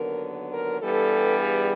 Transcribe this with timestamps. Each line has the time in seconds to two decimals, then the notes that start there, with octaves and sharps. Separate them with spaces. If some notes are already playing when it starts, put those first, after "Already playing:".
Already playing: D#2 D3 F#3 B3 A#4
0.53 A#4
0.82 G2 E3 G3 B3 A4
1.40 G#4